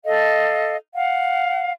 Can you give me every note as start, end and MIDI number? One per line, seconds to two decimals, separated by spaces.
0.05 0.76 69
0.05 0.76 75
0.05 0.76 77
0.94 1.71 77
0.94 1.71 78